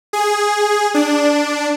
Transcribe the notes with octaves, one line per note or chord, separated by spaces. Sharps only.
G#4
D4